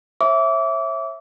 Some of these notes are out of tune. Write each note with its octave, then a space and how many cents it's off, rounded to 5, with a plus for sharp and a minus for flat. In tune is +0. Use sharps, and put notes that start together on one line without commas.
C#5 -40 E5 +0 D6 -30